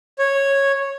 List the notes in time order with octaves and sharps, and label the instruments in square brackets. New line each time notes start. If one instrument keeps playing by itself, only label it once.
[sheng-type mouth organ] C#5